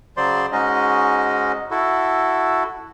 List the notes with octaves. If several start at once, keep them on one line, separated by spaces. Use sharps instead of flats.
C#3 F#3 C5 D5 C6
G#2 G#3 C#4 D#4 F#4 D#5
E4 F#4 A4